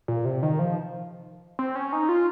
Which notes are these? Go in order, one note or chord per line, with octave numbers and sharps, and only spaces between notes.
A#2
C3
D#3
F3
C4
C#4
D#4
F4